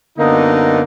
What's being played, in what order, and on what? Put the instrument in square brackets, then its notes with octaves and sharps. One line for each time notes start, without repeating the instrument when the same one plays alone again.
[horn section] F#2 D3 A#3 B3 D#4